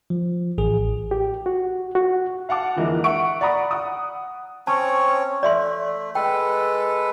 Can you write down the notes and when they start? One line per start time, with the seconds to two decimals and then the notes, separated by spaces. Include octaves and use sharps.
0.10 F3
0.58 A1 G#4
1.11 G4
1.46 F#4
1.95 F#4
2.49 F5 F#5 A5 D6
2.76 F2 D3 E3 G#3 A#3
3.04 E5 F#5 C#6 D7
3.41 D5 F#5 A#5 B5 D#6
3.71 F#5 D#6
4.67 C4 C#4 C#5 A5
5.43 A3 D5 E5 C6
6.15 G#3 A4 B4 G5